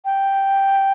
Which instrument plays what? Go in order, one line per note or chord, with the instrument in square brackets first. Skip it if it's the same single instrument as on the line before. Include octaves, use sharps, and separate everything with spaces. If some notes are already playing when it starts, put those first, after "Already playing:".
[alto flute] G5